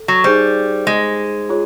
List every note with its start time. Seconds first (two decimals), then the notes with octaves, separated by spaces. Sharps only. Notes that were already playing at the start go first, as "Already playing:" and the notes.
Already playing: A4
0.08 F#3
0.24 G3 D#4 G#4 C5
0.87 G#3
1.49 F4 G#4 C#5